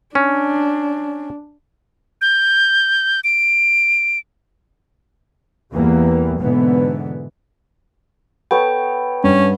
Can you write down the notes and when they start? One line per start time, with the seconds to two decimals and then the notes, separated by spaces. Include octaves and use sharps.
0.15 C#4 D4
2.21 G6
3.24 D7
5.72 E2 E3 G3 A#3
6.40 G#2 B2 D3 E3 B3
8.51 B3 A4 C#5 G5
9.24 G2 C#4